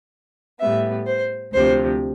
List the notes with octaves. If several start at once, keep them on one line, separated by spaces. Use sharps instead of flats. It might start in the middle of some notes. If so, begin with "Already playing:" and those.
A2 G3 B3 E5
C5
D2 C3 F3 C5